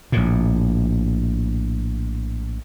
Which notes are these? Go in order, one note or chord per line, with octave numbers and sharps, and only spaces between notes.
A#1 A2